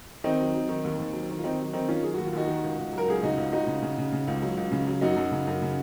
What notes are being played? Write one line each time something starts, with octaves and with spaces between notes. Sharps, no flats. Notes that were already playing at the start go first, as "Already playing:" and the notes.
D#3 C4 D#4
F#3
F#3
D#3
D#2
D#2
F#3
D#3
F4
D#3 C4 D#4
F#3
D#3 C4 D#4
D#3 C#4 F4
F#3 G#4
D#2 F#4
F4
D#2 D#4 F#4
D#3
C#2
C#2
F#3 A#4
C#2 G#4
C#3 D#4 F#4
C#2
C#2 D#4 F#4
C#3
C#3
C#3
C#3
C#2
F#3
C#2
C#3
F#3
F#2 D#4 F#4
F#2
C#3
F#2
C#3